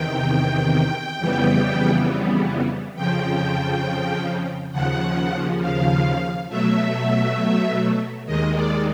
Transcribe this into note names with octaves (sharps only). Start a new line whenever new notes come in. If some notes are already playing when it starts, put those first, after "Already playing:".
Already playing: E2 C3 D#3 G5
F2 C#3 E3 G3 B3
F2 C#3 F3 G5
D#2 C#3 F3 F#5
F5
B2 F#3 A3 E5
D#2 D#3 G#3 D#5
D5